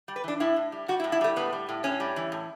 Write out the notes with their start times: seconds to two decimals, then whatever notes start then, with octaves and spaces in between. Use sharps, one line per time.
0.08 G3
0.16 B4
0.24 E3 D4
0.40 A2 E4
0.56 A2
0.72 G3
0.88 G3 F#4
1.00 E4
1.04 A2
1.12 E4
1.21 G3 A3
1.36 A2 B3
1.53 G3
1.69 A2
1.84 A2 C#4
2.00 G3
2.16 E3
2.32 A2